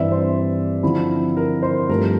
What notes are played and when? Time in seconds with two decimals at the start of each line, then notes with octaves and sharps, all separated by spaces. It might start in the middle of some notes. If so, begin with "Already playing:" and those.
Already playing: G2 E3 G3 C4 E4 D5 E5
0.12 C5
0.83 D3 F3 C4 E4
1.37 A#4
1.63 C5
1.89 G2 F3 A3 A#4